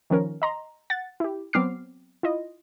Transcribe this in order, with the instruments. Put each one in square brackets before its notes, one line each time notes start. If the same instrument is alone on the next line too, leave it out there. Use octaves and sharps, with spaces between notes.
[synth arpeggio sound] D#3 F3 C#4 A#4
D#5 A#5 C6
F#5 A6
E4 G4
F#3 B3 C4 D6 F6 C7
E4 F4 D#5